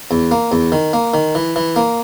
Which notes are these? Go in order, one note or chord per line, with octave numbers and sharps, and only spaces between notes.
E2
A#3
E2
D#3
A#3
D#3
E3
E3
A#3